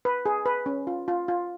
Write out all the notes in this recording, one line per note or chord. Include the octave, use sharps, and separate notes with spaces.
B4
G#4
B4
C#4
F4
F4
F4